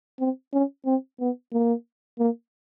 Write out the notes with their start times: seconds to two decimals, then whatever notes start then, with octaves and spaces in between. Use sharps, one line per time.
0.20 C4
0.53 C#4
0.86 C4
1.20 B3
1.53 A#3
2.19 A#3